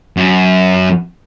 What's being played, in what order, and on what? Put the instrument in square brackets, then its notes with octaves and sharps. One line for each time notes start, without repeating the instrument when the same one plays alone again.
[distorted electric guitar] F#2